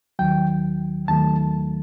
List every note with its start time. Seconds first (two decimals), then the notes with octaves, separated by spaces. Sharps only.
0.19 D#2 D#3 F#3 G5
1.08 D#2 D#3 F#3 A3 A5